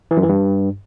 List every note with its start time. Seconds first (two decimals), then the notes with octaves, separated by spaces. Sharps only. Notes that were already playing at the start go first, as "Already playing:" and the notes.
0.11 E3
0.17 F#2
0.23 E3
0.29 G2